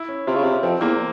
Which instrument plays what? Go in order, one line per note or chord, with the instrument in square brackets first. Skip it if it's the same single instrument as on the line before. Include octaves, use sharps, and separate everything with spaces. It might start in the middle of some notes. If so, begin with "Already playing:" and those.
Already playing: [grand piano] E4
C#4
[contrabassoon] C3 [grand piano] F4
[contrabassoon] C#3
C3
[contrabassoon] F2 [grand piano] C4
[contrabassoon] E2 [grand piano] A#3